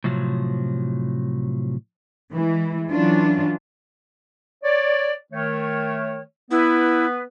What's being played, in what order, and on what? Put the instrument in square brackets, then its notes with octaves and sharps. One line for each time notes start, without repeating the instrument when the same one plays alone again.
[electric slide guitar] A2 C3 F3 F#3
[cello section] E3 G#3
E3 F#3 C#4 D4 F4
[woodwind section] C#5 D5
D#3 A3 C#5
[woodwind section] B3 B4 [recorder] E4